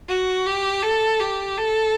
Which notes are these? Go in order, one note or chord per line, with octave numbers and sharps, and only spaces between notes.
F#4
G4
A4
G4
A4